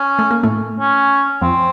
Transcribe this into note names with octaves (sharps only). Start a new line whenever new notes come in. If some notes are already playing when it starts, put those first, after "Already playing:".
Already playing: C#4
A3
A#3
A2 A3
C#4
F2 F3 C4